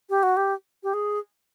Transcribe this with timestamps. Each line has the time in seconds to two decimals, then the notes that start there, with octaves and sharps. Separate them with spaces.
0.10 G4
0.23 F#4
0.37 G4
0.83 G4
0.94 G#4